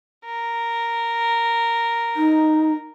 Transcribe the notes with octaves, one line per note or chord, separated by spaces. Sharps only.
A#4
D#4